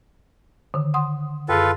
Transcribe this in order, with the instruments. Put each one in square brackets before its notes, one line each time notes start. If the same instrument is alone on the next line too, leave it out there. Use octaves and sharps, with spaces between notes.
[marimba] D3 D#3
F#5 C6 D#6
[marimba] F#2 G#4 [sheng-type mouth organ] F4 A4 B4